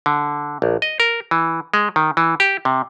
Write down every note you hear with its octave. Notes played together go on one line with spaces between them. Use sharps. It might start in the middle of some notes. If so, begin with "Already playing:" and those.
D3
A#1
D#5
A#4
E3
G#3
D#3
E3
G4
C3